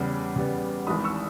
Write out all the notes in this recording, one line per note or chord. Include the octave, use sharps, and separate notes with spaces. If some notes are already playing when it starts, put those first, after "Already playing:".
Already playing: E2 C#3 G3 B3 B5
E2 C#3 G3 B3
G#1 G#2 E3 G#3 B5 D#6
C#6 E6